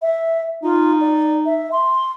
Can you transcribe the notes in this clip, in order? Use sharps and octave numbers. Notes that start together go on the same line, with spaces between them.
E5
D#4 F4
D5
E5
C6